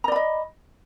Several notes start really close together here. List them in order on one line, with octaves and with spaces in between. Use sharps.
A#5 D5 B5 D#5